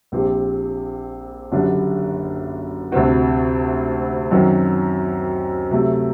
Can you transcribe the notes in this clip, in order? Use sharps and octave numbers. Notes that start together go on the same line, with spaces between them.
A#1 A#2 G3 C4 G4
F#1 F#2 D3 G3 D4
D2 C3 G3 C4 F#4
F#2 D#3 F#3 C4
C3 F#3 A3